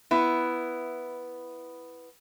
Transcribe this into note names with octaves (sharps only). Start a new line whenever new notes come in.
B3 E4